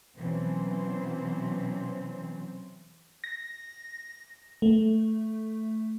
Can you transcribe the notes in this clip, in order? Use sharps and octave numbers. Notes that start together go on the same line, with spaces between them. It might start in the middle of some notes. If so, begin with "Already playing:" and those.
B2 E3 F#3 C4 C#4 C5
A#6
A3